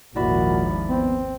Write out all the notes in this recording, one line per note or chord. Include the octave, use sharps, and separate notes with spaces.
G#1 D#2 A#2 F3 E4 F#4 D5 B5
B3 C4